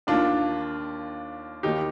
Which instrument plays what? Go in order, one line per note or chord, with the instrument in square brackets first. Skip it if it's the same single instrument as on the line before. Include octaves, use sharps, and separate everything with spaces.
[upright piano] D#2 D#3 A#3 D4 F4
D#2 D#3 A#3 D#4 G4